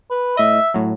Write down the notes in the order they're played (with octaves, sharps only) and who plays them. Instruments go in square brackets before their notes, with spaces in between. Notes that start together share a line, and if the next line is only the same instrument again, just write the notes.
[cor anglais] B4
[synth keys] A2 D#5 [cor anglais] E5
[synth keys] A2 F#3